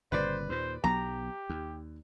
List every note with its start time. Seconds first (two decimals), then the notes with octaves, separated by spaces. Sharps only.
0.12 G1 A#2 C#3 B4 C5 D5
0.49 D#2 A#2 C5
0.84 B1 F#3 B3 G4 A#5
1.49 D#2